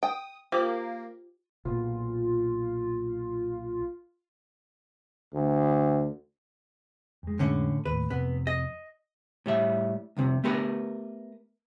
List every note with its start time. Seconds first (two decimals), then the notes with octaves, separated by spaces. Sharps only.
0.03 G5 D#6
0.52 A#3 F4 G4 C5
1.65 B1 A#2 F4
5.34 D2
7.23 F2 G#3
7.39 A2 D3 C#4
7.85 D#2 A2 B4
8.10 F2 C3 B3
8.47 D#5
9.46 A2 G3 E5
10.17 C2 F2 C3
10.44 A3 B3 G4 A#4 B4